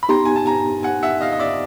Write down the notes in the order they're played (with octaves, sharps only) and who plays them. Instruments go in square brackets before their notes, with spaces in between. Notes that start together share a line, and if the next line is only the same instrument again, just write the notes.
[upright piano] B5
[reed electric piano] B3 D#4 G4 [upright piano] A#5 C6
[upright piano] G#5
A5
G#5 A#5
F#5 G#5
E5 F#5
D#5 F5
D#5
D5 E5